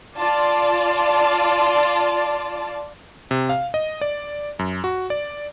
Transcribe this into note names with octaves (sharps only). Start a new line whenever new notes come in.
F4 D5 A5
C3
F5
D#5
D5
F#2
F#4
D5